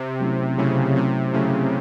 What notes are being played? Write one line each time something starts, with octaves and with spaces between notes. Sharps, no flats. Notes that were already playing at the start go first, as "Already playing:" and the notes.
Already playing: C3
F#3 A3 C#4 E4
C#3 F#3 A3 C#4 E4
C3 F#3 A3 C#4 E4
C#3 F#3 A3 C#4 E4